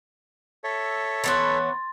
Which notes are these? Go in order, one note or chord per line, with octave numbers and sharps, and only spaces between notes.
A4 C#5 E5
E3 B3 C#4 C6 A6